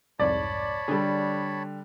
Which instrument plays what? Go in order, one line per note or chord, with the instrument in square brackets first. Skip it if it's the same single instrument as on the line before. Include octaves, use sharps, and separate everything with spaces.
[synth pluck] C2 F2 G#2 [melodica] C#5 A5 B5 [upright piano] D5
[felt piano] D3 G3 [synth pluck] G#4 A4